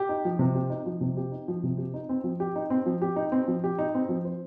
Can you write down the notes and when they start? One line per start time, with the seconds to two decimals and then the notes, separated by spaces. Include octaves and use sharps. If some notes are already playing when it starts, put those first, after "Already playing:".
Already playing: G4
0.09 D#4
0.25 F3
0.39 C3
0.54 G4
0.70 D#4
0.86 F3
1.01 C3
1.17 G4
1.32 D#4
1.48 F3
1.63 C3
1.78 G4
1.94 D#4
2.09 C4
2.24 F3
2.40 G4
2.56 D#4
2.70 C4
2.86 F3
3.02 G4
3.16 D#4
3.32 C4
3.48 F3
3.64 G4
3.79 D#4
3.94 C4
4.09 F3
4.25 C5